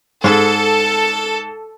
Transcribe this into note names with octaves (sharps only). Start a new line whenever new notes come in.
G#2 A4